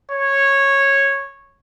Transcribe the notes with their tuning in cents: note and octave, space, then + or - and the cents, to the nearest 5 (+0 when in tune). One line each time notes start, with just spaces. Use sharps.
C#5 -10